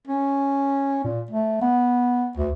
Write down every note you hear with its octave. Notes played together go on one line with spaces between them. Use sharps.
C#4
A#2
A3
B3
D2